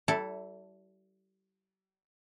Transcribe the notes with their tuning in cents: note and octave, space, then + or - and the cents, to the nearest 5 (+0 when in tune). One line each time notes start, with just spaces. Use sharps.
G3 -40 E4 +0 A4 +0